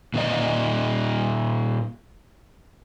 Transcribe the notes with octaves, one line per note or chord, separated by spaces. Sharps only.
A#2 D#3 D#4 D5